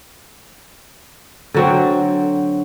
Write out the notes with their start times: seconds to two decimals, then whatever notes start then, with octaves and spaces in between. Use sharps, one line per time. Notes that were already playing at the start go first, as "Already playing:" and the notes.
1.54 D3 F#3 C4